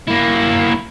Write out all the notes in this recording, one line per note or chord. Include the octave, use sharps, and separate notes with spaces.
A#3 E4